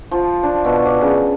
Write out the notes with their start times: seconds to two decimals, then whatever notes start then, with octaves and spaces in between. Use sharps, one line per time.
0.11 F3
0.43 D4
0.65 B2
0.86 D5
1.02 C#3